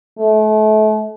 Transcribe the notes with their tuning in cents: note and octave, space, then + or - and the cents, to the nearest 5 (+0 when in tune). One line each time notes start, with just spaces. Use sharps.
A3 -35